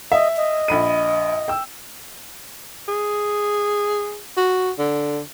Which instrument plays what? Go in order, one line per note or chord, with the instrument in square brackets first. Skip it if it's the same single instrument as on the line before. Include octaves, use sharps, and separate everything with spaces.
[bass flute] D#5 [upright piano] E5
[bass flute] D#5
[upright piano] A#1 B5 D#7
G5 E6
[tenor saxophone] G#4
F#4
D3